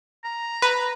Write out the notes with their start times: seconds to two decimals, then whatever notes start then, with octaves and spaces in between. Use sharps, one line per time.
0.24 A#5
0.62 B4